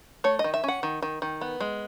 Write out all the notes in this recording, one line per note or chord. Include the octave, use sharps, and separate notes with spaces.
A3 C#5
D#5
D#3
E5
C#4 F#5
D#3
D#3
D#3
B3
G#3